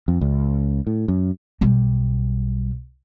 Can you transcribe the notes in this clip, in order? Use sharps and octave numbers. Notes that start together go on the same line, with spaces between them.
F2
C#2
A2
F#2
B1 G3